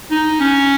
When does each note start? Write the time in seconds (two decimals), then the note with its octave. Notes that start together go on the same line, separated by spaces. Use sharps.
0.11 D#4
0.41 C#4